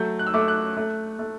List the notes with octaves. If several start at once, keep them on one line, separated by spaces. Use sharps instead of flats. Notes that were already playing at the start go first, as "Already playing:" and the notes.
Already playing: F#3 A3 G6
F#6
E6
A3 D6
E6
F#6
A3
A3